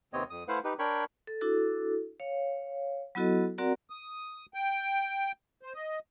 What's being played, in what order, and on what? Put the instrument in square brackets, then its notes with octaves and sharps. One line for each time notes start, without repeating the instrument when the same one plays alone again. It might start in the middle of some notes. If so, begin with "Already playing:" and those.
[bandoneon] D#2 C3 B3 C4 C#5 D#5
F2 D#6
A3 E4 B4 C5 F5 F#5
D#4 G4 B4
D4 A#4 C#5 G5 B5 C#6
[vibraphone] A4
D4 E4 F#4 A4
C#5 F5
F#3 B3 E4 F#4 A4 D#5
C4 F#4 A#4 D5 F#5 A#5
[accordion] D#6
G5
C5
D#5